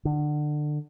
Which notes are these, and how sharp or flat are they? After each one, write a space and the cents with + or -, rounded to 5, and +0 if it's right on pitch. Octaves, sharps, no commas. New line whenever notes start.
D3 +25